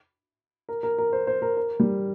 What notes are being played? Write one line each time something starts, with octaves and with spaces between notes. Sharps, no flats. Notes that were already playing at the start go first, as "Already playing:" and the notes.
A#4
A#4
A#4
C5
C5
A#4
A#4
G3